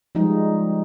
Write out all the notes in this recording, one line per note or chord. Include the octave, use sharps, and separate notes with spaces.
F3 G3 G#3 D#4